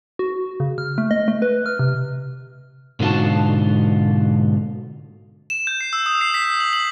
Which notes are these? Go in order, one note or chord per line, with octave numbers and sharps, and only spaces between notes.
F#4
C#3
F6
A3
D#5
A3
B4
F6
C3
G#2 B2 D3 F4 F#4 A5
E7
G6
C7
E6
D#6
C7
B6
F#7
F#7